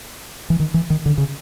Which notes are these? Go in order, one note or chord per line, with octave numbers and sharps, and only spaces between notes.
E3
D#3
E3
D#3
D3
C#3